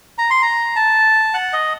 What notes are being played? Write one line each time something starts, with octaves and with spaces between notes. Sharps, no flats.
A#5
C6
A#5
A5
F#5
D#5